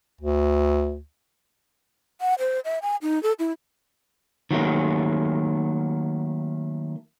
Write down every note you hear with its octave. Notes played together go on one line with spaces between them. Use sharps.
D2
F#5
C5
E5
G#5
D#4
A4
E4
D#3 F#3 A3 A#3